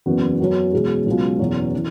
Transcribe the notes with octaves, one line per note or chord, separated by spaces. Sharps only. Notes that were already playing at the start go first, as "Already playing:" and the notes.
F#1 E2 E3 B3 F#4
F#2 F#3 B3
E2 B2 G#3
C#2 B2 F#3
F#1 E2 B2 F#3
E3